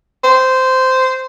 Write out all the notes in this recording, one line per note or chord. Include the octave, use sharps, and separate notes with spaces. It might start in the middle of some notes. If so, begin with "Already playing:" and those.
C5